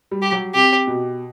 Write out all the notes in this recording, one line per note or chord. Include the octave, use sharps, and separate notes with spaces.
G3
G4
F#3
C3 G4
B2